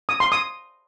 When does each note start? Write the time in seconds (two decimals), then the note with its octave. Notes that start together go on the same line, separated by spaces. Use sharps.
0.09 D#6
0.20 C6
0.32 D#6